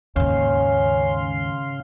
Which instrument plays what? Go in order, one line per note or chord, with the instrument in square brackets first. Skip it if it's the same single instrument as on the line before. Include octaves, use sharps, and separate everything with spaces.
[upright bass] D#2 G#2 [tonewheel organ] C#3 F5 C6 [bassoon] C#4